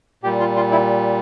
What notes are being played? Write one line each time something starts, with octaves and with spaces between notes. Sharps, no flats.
A#2 G3 G4
F4
F4
E4